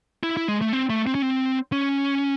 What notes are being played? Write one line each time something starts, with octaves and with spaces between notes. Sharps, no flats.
E4
E4
G#3
A3
C4
A3
C4
C#4
C4
C#4